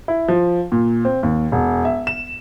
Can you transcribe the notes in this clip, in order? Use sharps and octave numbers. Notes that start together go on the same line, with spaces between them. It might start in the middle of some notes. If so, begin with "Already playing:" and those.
E4
F3
A#2
C4
D#2
E1
E5
E7